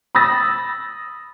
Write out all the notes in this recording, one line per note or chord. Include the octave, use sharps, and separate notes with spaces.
B5 D#6 E6 A6 A#6